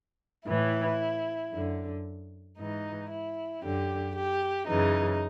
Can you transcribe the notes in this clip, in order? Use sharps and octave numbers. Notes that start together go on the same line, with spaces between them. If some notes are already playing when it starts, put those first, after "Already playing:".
A2 E3 E4
F#2 D3
G#2 E3 D#4
E4
F#2 D3 G4
G4
F#2 C#3 E3 D#4